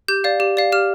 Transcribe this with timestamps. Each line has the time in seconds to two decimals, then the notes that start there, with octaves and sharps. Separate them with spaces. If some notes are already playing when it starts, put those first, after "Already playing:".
0.08 G4 G6
0.24 D5 F5
0.40 G4
0.57 D5 F5
0.72 G4 F6